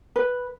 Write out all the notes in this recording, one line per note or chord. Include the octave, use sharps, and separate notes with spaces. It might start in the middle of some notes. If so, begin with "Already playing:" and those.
B4